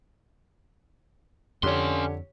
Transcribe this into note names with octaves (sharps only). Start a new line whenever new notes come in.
F2 D3 C#4 G4 C#5 C6